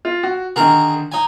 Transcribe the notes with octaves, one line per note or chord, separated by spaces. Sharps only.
F4
F#4
D3 D#3 G#4 A#4
D#4 G#5